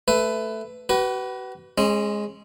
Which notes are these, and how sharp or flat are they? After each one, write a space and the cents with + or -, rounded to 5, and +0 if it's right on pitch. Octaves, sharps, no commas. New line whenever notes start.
A3 +0 B4 +15
F#4 +40 B4 +0
G#3 +0 C#4 -35